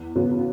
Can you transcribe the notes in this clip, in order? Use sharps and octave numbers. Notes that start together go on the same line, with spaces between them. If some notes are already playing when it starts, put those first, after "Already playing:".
Already playing: E2
C#3 F#3 B3